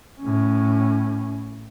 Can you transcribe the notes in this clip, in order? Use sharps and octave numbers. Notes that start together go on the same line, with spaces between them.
A2 C#4